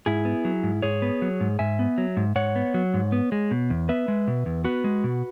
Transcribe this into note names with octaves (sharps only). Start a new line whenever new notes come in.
G#2 E4 G#4
B3
F#3
G#2
G#2 G#4 C#5
B3
F#3
G#2
G#2 E5 G#5
B3
F#3
G#2
G#2 C#5 F#5
B3
F#3
G#2
B3
G#3
B2
E2
B3 B4 E5
G#3
B2
E2
B3 F#4 B4
G#3
B2